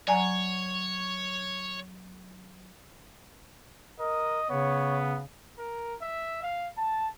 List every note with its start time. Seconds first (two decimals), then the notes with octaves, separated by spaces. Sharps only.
0.08 F#3 C#5 D5 F#5 G#5 A#5
4.00 A#4 D#5
4.50 C#3 B3 C#5
5.58 A#4
6.01 E5
6.43 F5
6.77 A5